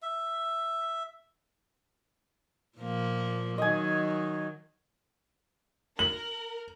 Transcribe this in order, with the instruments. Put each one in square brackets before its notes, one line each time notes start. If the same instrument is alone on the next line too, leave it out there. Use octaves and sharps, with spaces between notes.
[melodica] E5
[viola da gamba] A#2 F3 A#3
[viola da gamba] D#3 F#3 [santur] D#5 G#5
[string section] A#4 [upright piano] F#7